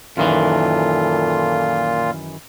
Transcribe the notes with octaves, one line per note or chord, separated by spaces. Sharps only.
F#2 A#2 D#3 E3 F4 A4